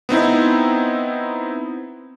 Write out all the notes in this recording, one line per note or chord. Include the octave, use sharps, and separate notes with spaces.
B3 C4 D#4 E4